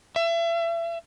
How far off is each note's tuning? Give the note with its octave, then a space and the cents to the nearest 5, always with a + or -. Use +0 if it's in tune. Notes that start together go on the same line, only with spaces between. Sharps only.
E5 +35